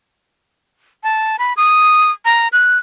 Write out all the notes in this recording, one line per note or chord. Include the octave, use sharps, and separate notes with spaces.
A5
B5
D#6
A#5
F#6